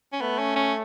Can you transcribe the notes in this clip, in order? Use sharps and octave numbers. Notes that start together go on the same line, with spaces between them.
C#4
A3 B3
C#4
C#4